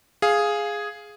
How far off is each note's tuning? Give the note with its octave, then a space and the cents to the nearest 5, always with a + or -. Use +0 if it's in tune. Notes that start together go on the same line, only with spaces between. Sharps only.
G#4 +0 F5 +0